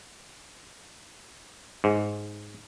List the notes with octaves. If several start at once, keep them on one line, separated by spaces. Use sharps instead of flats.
G#2